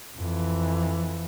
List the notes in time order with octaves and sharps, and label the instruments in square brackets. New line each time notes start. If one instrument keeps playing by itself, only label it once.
[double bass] F2 E3